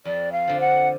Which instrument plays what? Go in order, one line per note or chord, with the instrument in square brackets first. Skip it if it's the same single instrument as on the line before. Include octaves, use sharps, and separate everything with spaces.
[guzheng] F2 [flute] D5
[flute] F5
[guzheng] D3 F3
[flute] F#5